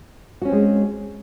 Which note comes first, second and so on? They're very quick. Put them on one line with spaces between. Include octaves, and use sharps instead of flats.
F#4 C#4 C4 G#3